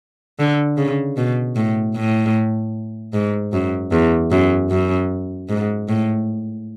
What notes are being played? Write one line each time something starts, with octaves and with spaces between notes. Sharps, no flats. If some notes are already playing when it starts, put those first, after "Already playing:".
D3
C#3
B2
A2
A2
G#2
F#2
E2
F#2
F#2
G#2
A2